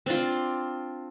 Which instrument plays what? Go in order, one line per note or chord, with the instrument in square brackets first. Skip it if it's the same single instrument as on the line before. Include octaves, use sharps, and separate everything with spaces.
[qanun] C4 D4 F4